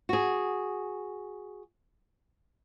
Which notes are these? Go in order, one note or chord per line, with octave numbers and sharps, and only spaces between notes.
F#4 G#4